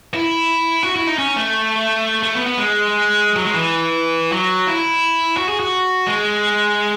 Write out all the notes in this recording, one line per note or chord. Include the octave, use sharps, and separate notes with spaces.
E4
F#4
E4
D#4
C#4
A3
A3
B3
B3
G#3
F#3
G#3
E3
F#3
E4
F#4
G#4
F#4
G#3